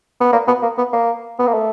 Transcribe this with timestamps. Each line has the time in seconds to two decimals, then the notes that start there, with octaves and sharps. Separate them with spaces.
0.20 B3
0.32 A#3
0.47 B3
0.62 A#3
0.77 B3
0.93 A#3
1.39 B3
1.47 A#3
1.53 A3